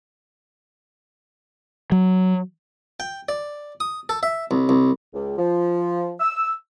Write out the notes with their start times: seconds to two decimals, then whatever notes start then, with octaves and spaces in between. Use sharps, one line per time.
1.92 F#3
3.00 G5
3.29 D5
3.80 D#6
4.09 A4
4.23 E5
4.51 C2
4.69 C2
5.14 C#2
5.38 F3
6.20 E6